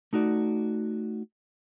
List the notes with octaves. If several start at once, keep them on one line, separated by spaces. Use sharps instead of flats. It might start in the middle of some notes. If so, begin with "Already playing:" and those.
A3 D#4 F#4 D5